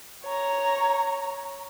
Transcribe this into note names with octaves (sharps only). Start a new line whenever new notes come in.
C#5 A#5